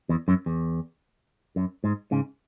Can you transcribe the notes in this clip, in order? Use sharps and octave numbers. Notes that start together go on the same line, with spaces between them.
E2
F#2
E2
F#2
G#2
G#2 C#3